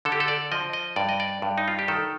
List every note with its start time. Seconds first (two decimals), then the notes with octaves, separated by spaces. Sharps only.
0.05 D3 A4
0.12 G4
0.20 A4
0.28 D5
0.52 F3 D#5
0.73 D#5
0.96 G2 D5
1.09 D#5
1.20 D5
1.42 G2
1.58 D#4
1.68 F4
1.79 G4
1.88 D#3 A4